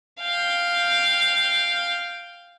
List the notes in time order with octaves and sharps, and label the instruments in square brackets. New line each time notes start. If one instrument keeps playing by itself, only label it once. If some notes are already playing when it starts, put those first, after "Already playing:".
[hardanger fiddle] F5 G5